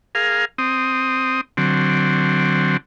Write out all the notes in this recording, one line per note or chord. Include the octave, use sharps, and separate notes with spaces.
G#4 A#4 F5
C4 D#6
D3 F#3 C4